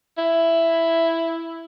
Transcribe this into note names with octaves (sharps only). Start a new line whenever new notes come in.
E4